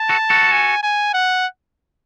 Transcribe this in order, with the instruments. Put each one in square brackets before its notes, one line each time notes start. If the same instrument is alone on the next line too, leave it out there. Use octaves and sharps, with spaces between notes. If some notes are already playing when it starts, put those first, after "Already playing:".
Already playing: [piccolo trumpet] A5
[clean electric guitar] F#4 A4
F#4 A4
[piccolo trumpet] G#5
G#5
F#5